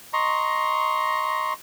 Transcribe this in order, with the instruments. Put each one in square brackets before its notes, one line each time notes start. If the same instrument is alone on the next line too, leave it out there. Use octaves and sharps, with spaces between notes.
[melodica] D#5 A#5 C6 C#6